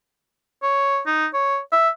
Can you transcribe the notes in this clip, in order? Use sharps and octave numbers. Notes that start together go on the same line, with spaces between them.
C#5
D#4
C#5
E5